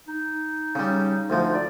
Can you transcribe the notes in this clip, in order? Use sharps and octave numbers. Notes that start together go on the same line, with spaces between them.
D#4
C#3 G3
D2 F3
D5